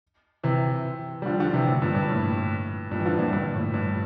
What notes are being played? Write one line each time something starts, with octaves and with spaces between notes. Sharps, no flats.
C3 E3
G3
D3 F3
D3 F3
C3 E3
A2 C3
G2 A#2
G2
A2
G2 A#2
E3
D3 F3
G2 A#2
G2
A2
G2